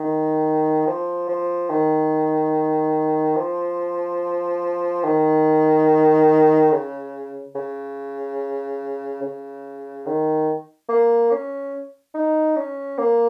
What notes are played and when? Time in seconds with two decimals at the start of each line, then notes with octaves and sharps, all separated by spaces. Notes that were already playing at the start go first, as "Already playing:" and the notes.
Already playing: D#3
0.87 F3
1.29 F3
1.70 D#3
3.37 F3
5.04 D#3
6.72 C#3
7.55 C#3
9.22 C#3
10.06 D#3
10.89 A#3
11.31 C#4
12.15 D#4
12.57 C#4
12.98 A#3